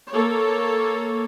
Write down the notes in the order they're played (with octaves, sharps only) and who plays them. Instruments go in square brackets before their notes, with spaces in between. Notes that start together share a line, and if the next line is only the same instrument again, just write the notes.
[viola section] A#3 A4 C#5